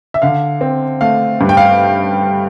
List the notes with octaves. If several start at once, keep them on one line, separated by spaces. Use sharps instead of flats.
E5
D3 F5
C4
A3 F5
G2
G5
F5